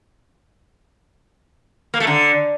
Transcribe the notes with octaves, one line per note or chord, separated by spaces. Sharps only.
A#3
A3
D3